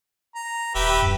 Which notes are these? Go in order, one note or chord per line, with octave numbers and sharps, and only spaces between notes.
A#5
D#1 G4 B4 E5
F#2